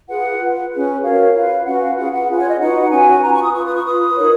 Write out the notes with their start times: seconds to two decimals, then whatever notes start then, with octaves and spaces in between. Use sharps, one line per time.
0.08 F4 G#4 B4 F#5
0.40 F4 B4
0.71 C#4 G#4 B4
1.02 F#4 A#4 C#5 F5
1.34 F4 B4
1.65 C#4 F#4 B4 F#5
1.82 F5
1.96 F4 G#4 B4 F#5
2.13 F#5
2.28 C#4 F4 G#4 B4
2.38 C#5
2.48 D#5
2.60 D#4 F#4 B4 F#5
2.91 C#4 F#4 B4 G#5
3.22 F4 B4 A#5
3.33 C#6
3.43 D#6
3.54 F4 B4 C#6
3.65 D#6
3.75 C#6
3.85 F4 B4 D#6
4.17 D#4 A#4 C#5